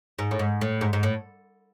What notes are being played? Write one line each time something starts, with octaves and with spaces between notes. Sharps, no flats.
G#2
A2
G#2
A2
G#2
G#2
A2